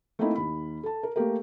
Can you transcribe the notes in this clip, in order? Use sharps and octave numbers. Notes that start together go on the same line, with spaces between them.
A3 A#3 C4 D#4 E4
D#2 B5
A4 A5
A#4
A3 A#3 G4 A#4